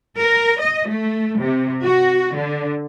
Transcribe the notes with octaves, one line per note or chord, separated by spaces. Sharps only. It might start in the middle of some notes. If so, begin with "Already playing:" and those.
A#4
D#5
A3
C3
F#4
D3